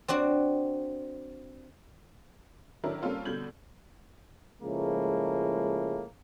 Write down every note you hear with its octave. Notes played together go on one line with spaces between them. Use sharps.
C4 D4 F#4
D#3 F#3 D4 E4 A4 A#4
G3 A#3 C4 C#4 F4 A4
B2 D3 G3 G6 G#6 F#7
C#2 A2 F3 G#3 A#3